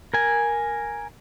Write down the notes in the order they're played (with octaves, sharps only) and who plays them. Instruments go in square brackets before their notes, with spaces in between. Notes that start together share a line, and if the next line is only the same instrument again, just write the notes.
[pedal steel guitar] A#4 G#5